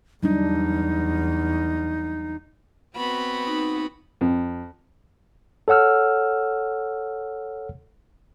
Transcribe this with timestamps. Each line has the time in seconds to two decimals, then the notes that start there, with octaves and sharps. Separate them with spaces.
0.23 E2 F#3 G3 D4 D#4
2.96 B3 C4 F#4 B5
3.47 D#4
4.21 F2
5.68 A4 C#5 F#5 E6 F6